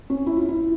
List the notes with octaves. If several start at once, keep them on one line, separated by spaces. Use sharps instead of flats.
C#4
E4
F4
E4